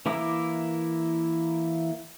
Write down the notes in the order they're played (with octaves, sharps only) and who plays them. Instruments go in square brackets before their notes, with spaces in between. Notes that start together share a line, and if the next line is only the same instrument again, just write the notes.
[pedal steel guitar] E3 A#3 E4 A#4 D6